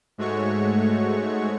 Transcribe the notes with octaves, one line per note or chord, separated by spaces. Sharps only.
G#2 G#3 A3 F#4 C#5 C#6